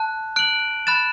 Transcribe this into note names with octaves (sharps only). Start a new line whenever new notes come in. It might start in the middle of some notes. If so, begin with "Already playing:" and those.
Already playing: A5 F#6
F#6 D7 F#7
B5 F#6 A6 E7